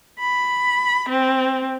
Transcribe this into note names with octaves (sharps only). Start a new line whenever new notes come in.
B5
C4